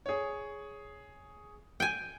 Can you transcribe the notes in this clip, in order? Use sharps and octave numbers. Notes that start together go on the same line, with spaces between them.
G#4 C#5
G5 G#5